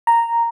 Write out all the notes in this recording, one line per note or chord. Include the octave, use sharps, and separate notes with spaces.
A#5